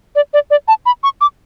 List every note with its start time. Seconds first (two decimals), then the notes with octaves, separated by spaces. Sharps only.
0.15 D5
0.33 D5
0.50 D5
0.68 A5
0.86 B5
1.03 C#6
1.21 D6